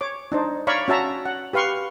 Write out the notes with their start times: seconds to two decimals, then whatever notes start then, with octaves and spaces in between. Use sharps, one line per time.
0.01 C#5 D6
0.32 D4 D#4 C5
0.67 C#5 D5 F5 A#5 B5 C#6
0.88 C#4 F#4 E5 A5 A#5
1.25 F#5
1.53 G4 B4 F5 C6 C#6